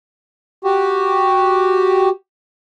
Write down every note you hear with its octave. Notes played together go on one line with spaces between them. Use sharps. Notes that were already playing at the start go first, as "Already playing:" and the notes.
F#4 G4